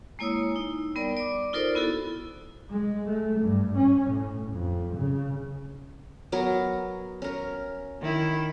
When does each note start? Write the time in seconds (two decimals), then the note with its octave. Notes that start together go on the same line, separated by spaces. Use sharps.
0.19 G#3 A#3 E4 C#5 D#6 E6
0.56 D#4
0.95 G3 B3 A#4 D5
1.17 D5 D6
1.53 D#4 F4 A4 A#4 C5 D5
1.75 B3 E4 F#4 A4
2.70 G#3
3.09 A3
3.40 G2
3.77 C#4
4.11 A2
4.53 F2
4.97 C#3
6.32 F#3 B3 A#4
7.22 C#4 A#4
8.01 D#3 E4